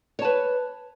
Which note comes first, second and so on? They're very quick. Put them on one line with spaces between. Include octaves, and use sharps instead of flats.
C#5 A5 B4